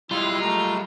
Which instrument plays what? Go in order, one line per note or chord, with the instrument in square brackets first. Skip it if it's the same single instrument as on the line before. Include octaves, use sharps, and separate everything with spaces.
[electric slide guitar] G3 G#3 [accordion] E4 F#6 [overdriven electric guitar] F4
[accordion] A3 A#5